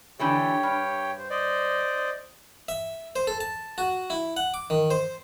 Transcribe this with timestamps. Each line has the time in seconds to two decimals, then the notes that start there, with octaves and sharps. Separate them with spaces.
0.19 D3 E3 A3 G4 C#5 G5
0.63 G2
1.18 C5
1.30 C5 D5 D#5
2.69 E5
3.16 C5
3.27 A4
3.41 A5
3.78 F#4
4.10 E4
4.37 F#5
4.54 D6
4.70 D#3
4.90 C5